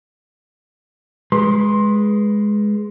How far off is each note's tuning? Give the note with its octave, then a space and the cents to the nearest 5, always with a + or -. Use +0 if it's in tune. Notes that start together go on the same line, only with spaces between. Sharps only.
G#3 +0 B4 -5 C6 +20